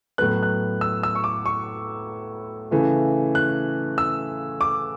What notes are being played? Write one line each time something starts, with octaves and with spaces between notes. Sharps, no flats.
A2 F#3 B3 F#6
F#6
E6
E6
C#6
D6
C#6
C#3 E3 A3
F#6
E6
D6